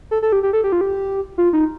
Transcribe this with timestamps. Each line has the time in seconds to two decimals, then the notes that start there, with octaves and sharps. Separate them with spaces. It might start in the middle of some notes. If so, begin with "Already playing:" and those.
0.11 A4
0.22 A4
0.32 G4
0.43 G4
0.53 A4
0.64 G4
0.72 F4
0.81 G4
1.38 F4
1.53 D#4